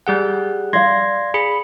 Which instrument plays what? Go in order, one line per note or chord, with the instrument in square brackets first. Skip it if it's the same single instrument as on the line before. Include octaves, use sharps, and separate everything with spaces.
[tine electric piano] G3 G#4 F#5
[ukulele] D5 F5 [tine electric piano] C6 G#6 A#6
[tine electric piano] G#4 B5 C#7